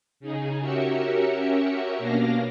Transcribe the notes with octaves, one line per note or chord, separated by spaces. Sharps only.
C#3 D#4 G#4
C#4 F#4 G4 A#4 E5 C#7
B2 A#3 C#4 D4 F5 A#6